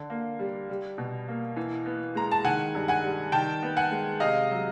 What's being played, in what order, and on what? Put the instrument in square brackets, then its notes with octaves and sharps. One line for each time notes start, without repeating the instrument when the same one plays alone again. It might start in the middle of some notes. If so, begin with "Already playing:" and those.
Already playing: [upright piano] D3
A#3
G3
G3
B2
A#3
E3
B3
G#3 A#5
A5
D#3 F#5 G#5
G2
F#5 G#5
G3
D#3 G5 A5
B3
F#5 G#5
G#3
C3 D#5 F5
F#3